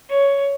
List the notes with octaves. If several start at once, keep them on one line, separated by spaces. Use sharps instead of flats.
C#5